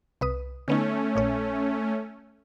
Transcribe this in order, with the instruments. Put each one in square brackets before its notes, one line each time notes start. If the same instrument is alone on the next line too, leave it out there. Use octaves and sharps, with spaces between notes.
[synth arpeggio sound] C2 B4 D#6
[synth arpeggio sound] D3 B3 D#4 [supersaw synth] A3 C#4
[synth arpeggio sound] A#1 A#2 C#5